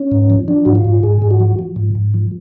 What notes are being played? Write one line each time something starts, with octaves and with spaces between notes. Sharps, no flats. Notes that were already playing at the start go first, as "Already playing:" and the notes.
Already playing: C#4
G#2
F3
F3 D4
G#2 F#4
F4
G#2
G#2 G#4
G#2
F#4
F3
F3
G#2
G#2
F3